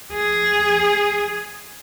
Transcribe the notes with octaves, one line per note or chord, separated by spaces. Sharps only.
G#4